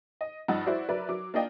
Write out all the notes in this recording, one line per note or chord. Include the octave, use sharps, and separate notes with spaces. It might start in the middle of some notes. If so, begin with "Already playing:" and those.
D#5
G2 F3 D#4 F#5 E6 A6
E4 F#4 C5 D5
F#3 A#4 B4 D5 E5
F#3 D6
A#3 D4 F4 D5 D#5 G5